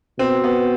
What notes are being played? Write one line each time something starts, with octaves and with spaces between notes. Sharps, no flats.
B2 C4
B3